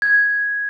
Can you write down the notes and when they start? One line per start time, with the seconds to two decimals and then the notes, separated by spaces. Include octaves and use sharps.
0.02 G#6